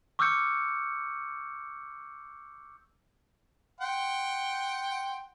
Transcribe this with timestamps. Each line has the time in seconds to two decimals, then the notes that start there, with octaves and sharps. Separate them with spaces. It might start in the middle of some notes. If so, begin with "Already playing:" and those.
0.19 C#6 D6 E6 F6 G6 C#7
3.81 F#5 G5 C6